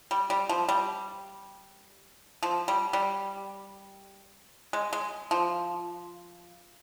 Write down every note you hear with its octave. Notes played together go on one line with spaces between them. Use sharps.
G3
G3
F3
G3
F3
G3
G3
G#3
G#3
F3